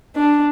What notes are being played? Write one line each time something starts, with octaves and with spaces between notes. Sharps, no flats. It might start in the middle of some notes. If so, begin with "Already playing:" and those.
D4